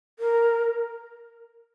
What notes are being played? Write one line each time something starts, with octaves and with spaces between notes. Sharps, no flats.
A#4